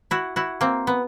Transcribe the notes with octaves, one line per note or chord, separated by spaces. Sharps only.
E4 F#4
E4 F#4
A#3 C4
B3